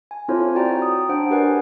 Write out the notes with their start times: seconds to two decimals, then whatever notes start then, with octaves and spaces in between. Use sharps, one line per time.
0.11 G#5
0.28 C4 E4 F4 A4 C5 C#5
0.55 F#4 D5 G5 A#5
0.82 D#6
1.09 D4 C5 F#5 D7
1.31 G4 A#4 B4 D5 F#5 G#5